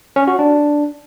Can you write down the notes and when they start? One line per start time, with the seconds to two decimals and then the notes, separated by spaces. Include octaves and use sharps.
0.16 C#4
0.27 F#4
0.39 D4